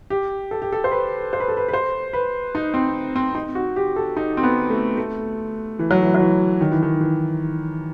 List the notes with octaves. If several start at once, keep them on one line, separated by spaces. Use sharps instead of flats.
G4
A4
G4
A4
C5
B4
C5
B4
A4
B4
B4
C5
B4
D#4
C4
C4
D#4
F#4
G4
A4
D#4
C4
B3
A3
A3
E3
F#3
E3
F#3
E3
D#3
E3
D#3
E3